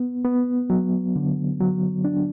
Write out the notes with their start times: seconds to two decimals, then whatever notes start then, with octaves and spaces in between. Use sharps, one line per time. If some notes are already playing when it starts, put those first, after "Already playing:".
Already playing: B3
0.25 B3
0.70 F#3
1.16 D3
1.61 F#3
2.04 D4